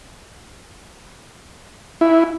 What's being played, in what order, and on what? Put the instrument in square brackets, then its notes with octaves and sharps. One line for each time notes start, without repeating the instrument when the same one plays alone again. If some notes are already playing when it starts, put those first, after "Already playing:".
[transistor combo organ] E4